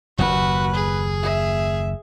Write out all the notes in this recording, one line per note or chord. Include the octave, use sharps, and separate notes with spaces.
F#1 D#2 F#4 B4
G#4
E5